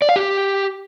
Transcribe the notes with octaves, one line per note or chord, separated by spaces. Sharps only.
D5
F5
G4